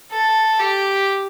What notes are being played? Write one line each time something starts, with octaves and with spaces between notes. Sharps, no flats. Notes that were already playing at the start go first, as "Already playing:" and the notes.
A4
G4